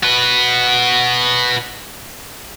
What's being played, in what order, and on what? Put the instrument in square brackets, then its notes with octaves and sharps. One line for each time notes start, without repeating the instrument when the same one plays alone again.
[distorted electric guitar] F#4 B4